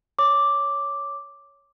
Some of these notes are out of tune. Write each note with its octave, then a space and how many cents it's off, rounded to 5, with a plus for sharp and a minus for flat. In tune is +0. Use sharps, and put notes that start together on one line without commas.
C#5 +5 D6 +0